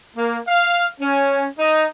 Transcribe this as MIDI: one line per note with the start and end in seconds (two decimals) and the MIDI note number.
0.17 0.39 58
0.47 0.87 77
1.01 1.46 61
1.58 1.86 63